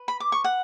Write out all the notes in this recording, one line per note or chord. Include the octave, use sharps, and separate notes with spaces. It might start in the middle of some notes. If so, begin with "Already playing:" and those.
Already playing: B4
B5
D6
C#6
F#5